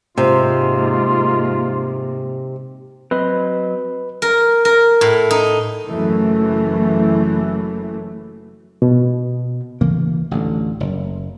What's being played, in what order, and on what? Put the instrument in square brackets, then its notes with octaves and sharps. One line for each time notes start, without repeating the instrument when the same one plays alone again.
[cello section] G#2 A#3 [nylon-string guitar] C3 [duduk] F4
[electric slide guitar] F#3 C4 D#5 [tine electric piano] B4
[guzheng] A#4
A#4
A2
D#4
[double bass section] F#1 F#2 E3 A3
[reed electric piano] B2
[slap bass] D2 C#3 E3 A#3
A1 D2 D3
F#1